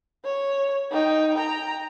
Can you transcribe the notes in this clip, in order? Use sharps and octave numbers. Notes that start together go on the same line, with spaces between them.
C#5
D#4 G5
G5 A#5